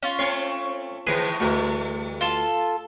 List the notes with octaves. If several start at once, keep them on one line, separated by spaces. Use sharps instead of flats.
C#4 F4
A3 C4 C#5 C6
A2 D#3 G#4 B4
D2 E3 G3 A3
F4 A4